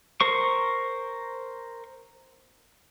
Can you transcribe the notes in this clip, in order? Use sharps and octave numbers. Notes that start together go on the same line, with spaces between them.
A#4 C5 C#6